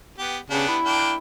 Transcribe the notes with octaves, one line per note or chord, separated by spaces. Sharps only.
B3 G4
C#3 B3 D4 G4
E4
A#3 D4 G5